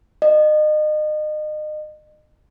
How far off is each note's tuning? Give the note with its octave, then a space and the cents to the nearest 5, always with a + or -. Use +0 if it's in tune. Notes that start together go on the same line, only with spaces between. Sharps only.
D#5 -30